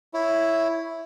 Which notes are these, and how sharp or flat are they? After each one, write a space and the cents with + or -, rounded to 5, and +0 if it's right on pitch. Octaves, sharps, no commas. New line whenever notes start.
E4 +0 C#5 +0